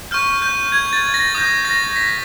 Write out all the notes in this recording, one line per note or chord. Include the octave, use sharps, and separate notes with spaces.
C#6 F6 G6
G6
G#6
A6
A#6
D#6 G6
A#6
B6